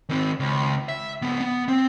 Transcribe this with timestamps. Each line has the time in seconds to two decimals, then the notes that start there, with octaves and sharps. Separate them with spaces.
0.09 D#3 C4
0.40 C#2
0.89 E5
1.22 C#2 B3
1.41 B3
1.68 C4